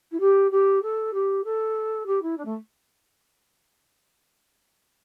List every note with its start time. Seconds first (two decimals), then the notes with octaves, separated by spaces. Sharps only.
0.11 E4
0.20 G4
0.51 G4
0.82 A4
1.13 G4
1.44 A4
2.06 G4
2.22 E4
2.37 D4
2.45 A3